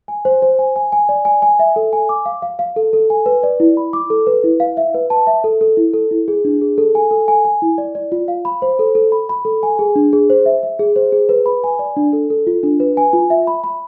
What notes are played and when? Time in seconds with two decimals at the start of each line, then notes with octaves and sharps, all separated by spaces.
0.08 G#5
0.25 C5
0.42 C5
0.59 G#5
0.76 G#5
0.92 G#5
1.09 D5
1.25 G#5
1.42 G#5
1.59 E5
1.76 A4
1.93 G#5
2.09 D6
2.26 F5
2.42 F5
2.59 F5
2.76 A4
2.93 A4
3.10 G#5
3.26 B4
3.43 D5
3.60 E4
3.77 B5
3.93 D6
4.10 A4
4.27 B4
4.44 E4
4.60 F5
4.77 E5
4.94 B4
5.10 A5
5.27 E5
5.44 A4
5.61 A4
5.77 E4
5.94 A4
6.11 E4
6.28 G#4
6.45 D4
6.62 G#4
6.78 A4
6.95 G#5
7.11 A4
7.28 G#5
7.45 G#5
7.62 E4
7.78 D5
7.95 D5
8.12 F4
8.28 F5
8.45 B5
8.62 C5
8.79 A4
8.95 A4
9.12 B5
9.29 B5
9.45 A4
9.63 G#5
9.79 G#4
9.96 D4
10.13 G#4
10.30 C5
10.46 E5
10.63 E5
10.79 G#4
10.96 C5
11.12 G#4
11.29 B4
11.46 B5
11.64 G#5
11.79 D5
11.97 D4
12.13 A4
12.30 A4
12.47 F4
12.63 D4
12.80 B4
12.97 G#5
13.13 F4
13.30 E5
13.47 B5
13.64 B5